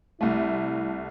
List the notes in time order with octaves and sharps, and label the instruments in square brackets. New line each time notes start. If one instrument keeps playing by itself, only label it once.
[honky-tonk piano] C2 A3 [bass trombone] E4